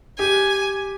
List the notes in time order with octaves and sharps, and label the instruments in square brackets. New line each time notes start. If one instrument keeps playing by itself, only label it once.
[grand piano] G4 [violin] G#5